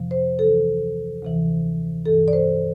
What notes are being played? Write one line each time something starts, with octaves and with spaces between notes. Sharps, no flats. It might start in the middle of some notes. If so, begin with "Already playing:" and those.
Already playing: F2 C3 F3
C5
D2 C3 E3 A4
D2 C3 E3
G2 E3 A4
D5
C5